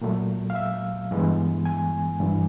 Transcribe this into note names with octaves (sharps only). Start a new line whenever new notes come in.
A#2 F#3 A3
F5
E5
G2 E3 G#3 B3
G#5
G2 E3 G3